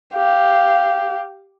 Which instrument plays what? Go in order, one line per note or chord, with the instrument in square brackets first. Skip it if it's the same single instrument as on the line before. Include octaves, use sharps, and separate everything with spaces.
[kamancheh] G4 F5